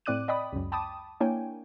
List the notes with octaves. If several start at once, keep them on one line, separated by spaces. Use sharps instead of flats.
A2 C4 D5 D6 F#6 D#7
D5 D#5 G5 B5 D#6
C#2 F#2
G5 A5 B5 D6 D#6
A#3 D4 E4 C#5 G5 G#5